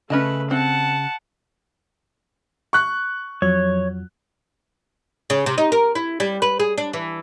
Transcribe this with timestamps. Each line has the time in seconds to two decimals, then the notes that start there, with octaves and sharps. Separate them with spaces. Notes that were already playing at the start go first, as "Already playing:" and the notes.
0.10 C#3 A3 C#4 B4 D#5 A5
0.51 C4 F#5 A5
2.73 C#6 F#6
3.42 F2 F#3 C#5
5.30 C#3
5.46 C3
5.58 D#4
5.72 A#4
5.95 E4
6.20 G3
6.42 B4
6.60 G#4
6.78 D4
6.93 E3